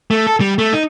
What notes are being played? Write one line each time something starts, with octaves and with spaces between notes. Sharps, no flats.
A3
A4
G3
A3
D#4